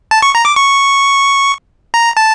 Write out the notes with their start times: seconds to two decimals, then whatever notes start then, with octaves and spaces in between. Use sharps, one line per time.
0.11 A5
0.22 C#6
0.35 A#5
0.45 D6
0.56 C#6
1.94 A#5
2.17 A5